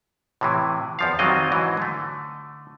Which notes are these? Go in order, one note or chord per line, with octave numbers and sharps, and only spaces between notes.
A2 C3 E3
E2 F3 F5
F2 D#3 F#3 G3 C4 D#5
G#2 E3 F#3
D3 A3